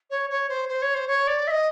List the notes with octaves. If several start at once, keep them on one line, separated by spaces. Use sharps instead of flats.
C#5
C#5
C5
C5
C#5
C5
C#5
D5
E5
D#5